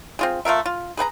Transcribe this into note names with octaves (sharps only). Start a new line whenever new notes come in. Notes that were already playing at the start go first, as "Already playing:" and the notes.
C4 F4 G#4
A3 F4 A#4 E5
F4
G#4 B4 F#5 A#5